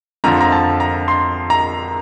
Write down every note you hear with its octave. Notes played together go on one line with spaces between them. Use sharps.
F2 D3 F3 A#5
A#5
A5
A#5
C6
A#5